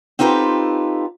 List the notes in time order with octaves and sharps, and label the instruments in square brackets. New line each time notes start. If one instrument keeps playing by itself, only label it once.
[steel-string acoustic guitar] C4 D#4 F4 G4 A4 B4